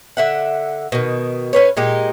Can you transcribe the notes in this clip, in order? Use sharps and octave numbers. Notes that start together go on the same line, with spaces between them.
D3 E5 F#5
B2 D#3
C#4 B4 C#5
A#2 G#3 D#4 G4